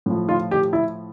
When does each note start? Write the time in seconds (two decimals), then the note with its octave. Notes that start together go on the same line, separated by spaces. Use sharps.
0.06 A2 F3
0.29 F4
0.51 G4
0.73 E4